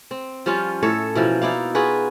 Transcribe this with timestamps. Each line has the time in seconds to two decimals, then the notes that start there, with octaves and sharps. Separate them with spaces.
0.11 C4
0.46 F3 G3 C#4 F4
0.83 A2 A4 C#5 E5
1.15 B2 E3 F3 A#3
1.42 D#4 E4 D5 F5
1.75 F4 F#4 G#4 B4